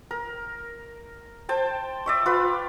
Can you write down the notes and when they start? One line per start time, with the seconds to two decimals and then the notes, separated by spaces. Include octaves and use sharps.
0.11 A#4
1.49 C5 G5 A5
2.06 D5 E5 C#6
2.26 F4 B4